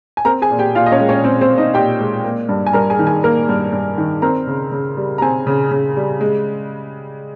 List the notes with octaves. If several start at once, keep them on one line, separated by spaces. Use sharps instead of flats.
G#5
C4 A#4 A#5
G#4 G#5
A#2
G4 G5
A#2 F4 F5
D#5
C#4 C#5
G#3
C#4 C#5
C4
C4 C5
A#2
D#4 D#5
A#2 G4 G5
G#3
A#3
G2
G#5
G2 A#4 A#5
G#4 G#5
D#3
G#4 G#5
A#3 A#4 A#5
G2
G2
D#3
C4 A#4 A#5
C#3
C#3
G3
A#5
C4 G#4 G#5
C#3
C#3
G3
G#3